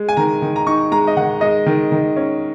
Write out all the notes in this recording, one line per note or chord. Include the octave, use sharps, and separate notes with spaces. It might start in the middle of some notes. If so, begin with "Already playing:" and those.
Already playing: G#3
G#5
D#3 A#5
D#3
A#5
D#4 C#6
G#3 A#5
D#5
D#3 F#5
G#3 D#5
D#3
D#3
C#4